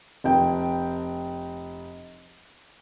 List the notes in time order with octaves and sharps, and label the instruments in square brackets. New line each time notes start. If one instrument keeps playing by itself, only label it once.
[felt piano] F1 G5